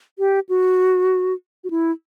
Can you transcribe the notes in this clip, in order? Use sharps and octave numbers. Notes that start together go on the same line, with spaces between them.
G4
F#4
F#4
E4